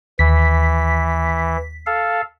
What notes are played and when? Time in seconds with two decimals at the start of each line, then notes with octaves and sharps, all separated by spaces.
0.19 D#2 E3 B6
1.86 A4 F5